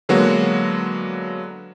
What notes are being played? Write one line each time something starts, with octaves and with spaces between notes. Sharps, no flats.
D3 F#3 G#3 A#3 B3 F#4